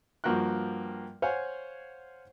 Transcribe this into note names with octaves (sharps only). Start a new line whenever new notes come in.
G2 F3 A#3 F#4 G5 F#6
C5 C#5 F5 F#5 G#5